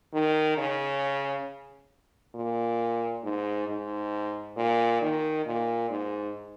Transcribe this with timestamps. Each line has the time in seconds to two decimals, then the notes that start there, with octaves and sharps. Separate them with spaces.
0.13 D#3
0.57 C#3
2.35 A#2
3.23 G#2
3.68 G#2
4.57 A#2
5.01 D#3
5.45 A#2
5.90 G#2